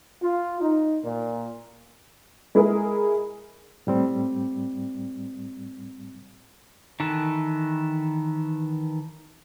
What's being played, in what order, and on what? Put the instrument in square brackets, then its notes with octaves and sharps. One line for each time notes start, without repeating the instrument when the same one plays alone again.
[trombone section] F4
D#4
A#2
[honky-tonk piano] G#3 E4 G#4 A#4
[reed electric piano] A2 G3 C4
[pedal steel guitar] D#3 E3 A4 B4